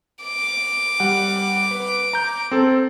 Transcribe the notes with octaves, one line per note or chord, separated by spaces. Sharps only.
D6
G3 F#5
B4
A#5 G6
C4 A4